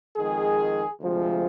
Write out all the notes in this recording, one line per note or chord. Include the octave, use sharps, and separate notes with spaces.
F2 D#3 G#3 G#4
D2 C3 F3 G#3